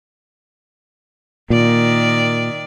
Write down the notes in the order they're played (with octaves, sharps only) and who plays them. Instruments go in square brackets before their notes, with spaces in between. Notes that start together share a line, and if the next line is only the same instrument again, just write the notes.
[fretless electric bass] A#2 [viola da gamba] D#3 D5